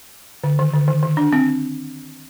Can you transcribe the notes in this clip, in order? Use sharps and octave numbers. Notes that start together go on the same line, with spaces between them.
D3
D#3
D3
D#3
D#3
D4
C4